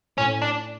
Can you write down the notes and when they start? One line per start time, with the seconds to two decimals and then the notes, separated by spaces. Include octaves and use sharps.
0.17 A2 C#4
0.42 D4